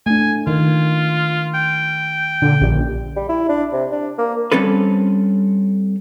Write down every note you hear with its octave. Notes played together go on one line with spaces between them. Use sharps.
A3 D4 G#5
D#3 F4
G5
A#2 D3
A#1 C#4 G4 D5
G3
E4
D4
C3
D4
A#3
G3 C4 C#4 A4 B4